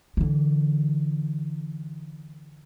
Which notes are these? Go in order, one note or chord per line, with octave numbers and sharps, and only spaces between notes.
D3 E3